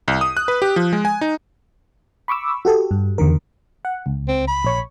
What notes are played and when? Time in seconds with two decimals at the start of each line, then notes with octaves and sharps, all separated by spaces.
0.08 C2
0.21 D#6
0.37 F#6
0.48 B4
0.62 G4
0.76 F3
0.93 G#3
1.05 G#5
1.21 D#4
2.28 B5 C#6 D6 E6
2.65 F#4 G4 A4
2.91 G2
3.18 E2 D3 D#3 A#4
3.85 F#5
4.06 C#2
4.28 C4
4.48 B5
4.64 A#1 C#5 C#6